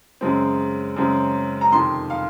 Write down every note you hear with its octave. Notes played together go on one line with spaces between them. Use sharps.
F#2 C#3 G#3 C4
F#2 C#3 G#3 C4
A#5
F2 C3 D#3 C6
F5